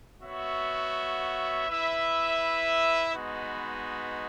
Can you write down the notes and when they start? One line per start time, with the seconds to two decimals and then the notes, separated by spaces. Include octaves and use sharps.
0.22 B3 F#4 C#5 E5
1.67 E4 B4 E5
3.13 G#3 B3 D#4 F#4 B4